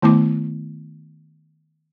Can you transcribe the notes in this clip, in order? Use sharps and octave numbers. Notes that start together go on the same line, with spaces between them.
D#3 A3 B3 E4 D6